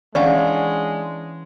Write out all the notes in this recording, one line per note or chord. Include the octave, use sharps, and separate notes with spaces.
E3 G#3 C#4 D4 C#5 F5 F#5